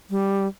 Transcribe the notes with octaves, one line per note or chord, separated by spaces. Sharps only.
G3